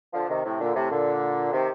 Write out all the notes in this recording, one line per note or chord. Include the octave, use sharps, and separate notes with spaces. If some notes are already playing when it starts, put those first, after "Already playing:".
D3 F3
C3 D#3
A2 C3
A#2 D3
A2 C3
A#2 D3
C3 D#3